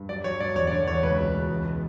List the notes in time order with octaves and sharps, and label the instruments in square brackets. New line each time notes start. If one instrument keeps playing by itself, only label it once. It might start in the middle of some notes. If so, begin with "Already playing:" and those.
Already playing: [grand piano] G2
F#3 D5
F#3 C#5
G2 D5
E2 C#5
D5
D3 C#5
E2 C#5
C#2 B4
B2
C#2
E2
B2